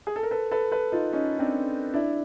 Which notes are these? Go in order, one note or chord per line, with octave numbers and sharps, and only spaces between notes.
G#4
A4
A#4
A4 B4
A4 B4
A4 B4
D#4 F4
C#4 D#4
C4 D4
D4 E4